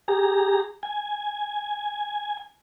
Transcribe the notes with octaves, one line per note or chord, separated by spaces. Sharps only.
G4 G#4 A#5
G#5